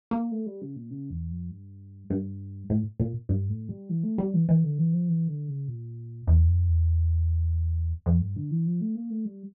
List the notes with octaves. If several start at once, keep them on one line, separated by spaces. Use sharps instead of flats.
A#3
A3
G3
C#3
A#2
C#3
E2
F2
G2
G2
A2
A#2
G2
A2
G3
E3
A3
G3
E3
E3
D3
E3
F3
E3
D3
C#3
A#2
E2
F2
E2
F2
G2
D3
E3
F3
A3
A#3
A3
G3